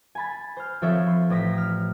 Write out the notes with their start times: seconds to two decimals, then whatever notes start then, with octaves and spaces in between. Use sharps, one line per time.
0.15 G#5 B5 A6
0.57 C5 F6
0.82 F3 C4 A4 C#5 E5
1.07 C6
1.30 A1 C4 D#6 A#6 B6
1.58 F6